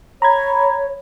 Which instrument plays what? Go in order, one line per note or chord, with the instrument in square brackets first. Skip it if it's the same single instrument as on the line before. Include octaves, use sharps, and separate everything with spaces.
[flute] C#5 [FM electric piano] A#5 B5 G#6